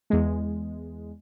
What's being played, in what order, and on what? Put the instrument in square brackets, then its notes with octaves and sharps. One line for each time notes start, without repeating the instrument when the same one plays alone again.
[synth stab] E2 G#3